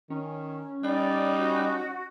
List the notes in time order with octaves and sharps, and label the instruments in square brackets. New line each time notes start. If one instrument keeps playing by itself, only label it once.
[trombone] D#3 [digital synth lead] C#4
[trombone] G3 [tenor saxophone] D#4 [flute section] D5
[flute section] F#4